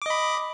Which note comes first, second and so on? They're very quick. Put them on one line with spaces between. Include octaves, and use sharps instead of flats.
D6 D#5 B5